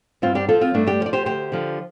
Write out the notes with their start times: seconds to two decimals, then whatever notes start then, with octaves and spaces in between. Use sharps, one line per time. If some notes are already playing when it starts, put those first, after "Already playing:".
0.22 G2 C4 F4
0.35 D4 G4
0.49 F3 F4 A4
0.61 C4 F4
0.74 G2 A3 D4
0.87 D4 G4
1.00 F3
1.06 D5
1.13 G4 C5
1.26 D2 G4 C5
1.52 D3 F3